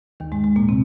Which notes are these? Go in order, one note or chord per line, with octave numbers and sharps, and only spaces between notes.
D#2 D#3
G#2 G#3
G#2 G#3
A#2 A#3
C3 C4